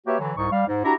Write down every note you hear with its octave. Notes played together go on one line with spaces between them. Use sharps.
A#3 F#4 G4 B4 C#5 E5
D3 E3 F#3
C2 G#2 D#4 C#6
G3 F5
G#2
D4 E4 F#4 G4 A#5